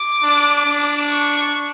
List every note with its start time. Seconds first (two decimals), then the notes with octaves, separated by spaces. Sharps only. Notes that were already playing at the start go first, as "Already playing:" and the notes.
Already playing: D6
0.23 D4
0.66 D4
1.09 C#6